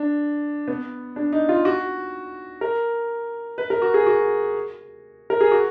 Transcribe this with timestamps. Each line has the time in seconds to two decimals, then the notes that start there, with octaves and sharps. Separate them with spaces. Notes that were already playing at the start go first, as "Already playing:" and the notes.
Already playing: D4
0.68 B3
1.16 D4
1.32 D#4
1.49 F4
1.65 F#4
2.61 A#4
3.58 B4
3.70 A#4
3.82 F#4
3.94 G#4
4.06 F#4
5.30 A#4
5.41 G#4
5.51 F#4